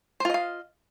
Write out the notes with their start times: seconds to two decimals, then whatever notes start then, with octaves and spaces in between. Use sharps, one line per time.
0.20 C5
0.25 F4
0.30 D#5
0.34 F5